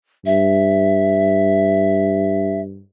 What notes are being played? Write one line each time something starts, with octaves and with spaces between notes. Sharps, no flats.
G2 E5